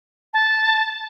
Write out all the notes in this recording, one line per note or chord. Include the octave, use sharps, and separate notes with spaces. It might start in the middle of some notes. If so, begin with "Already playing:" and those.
A5